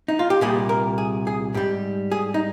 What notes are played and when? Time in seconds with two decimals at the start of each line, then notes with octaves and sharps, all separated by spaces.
0.08 D#4
0.19 F4
0.30 G4
0.41 C2 A#2 G3 G#4
0.69 A#4
0.98 G#4
1.27 G#4
1.54 G#2 G3 G4
2.12 G#4
2.34 D#4